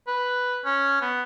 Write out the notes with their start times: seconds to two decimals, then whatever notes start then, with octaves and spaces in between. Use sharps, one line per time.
0.07 B4
0.65 C#4
1.02 B3